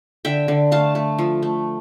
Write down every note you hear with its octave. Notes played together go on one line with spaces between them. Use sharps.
D3 E5 G5
D3
A3 F5 A5
A3
F3
A3